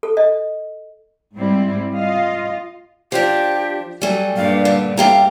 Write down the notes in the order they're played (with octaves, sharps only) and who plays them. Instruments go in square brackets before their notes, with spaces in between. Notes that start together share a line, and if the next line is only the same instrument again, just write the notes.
[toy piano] A4
D#5
[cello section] G#2 G3 C4 E4
F4 D#5 F5
[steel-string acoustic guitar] F3 D4 [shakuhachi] G4
[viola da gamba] F#3 [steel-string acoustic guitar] G3 A3 [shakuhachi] G#5
[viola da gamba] G2 A#2 [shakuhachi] F5
[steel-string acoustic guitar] D3
[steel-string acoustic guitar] A3 G4 A#5 [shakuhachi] F5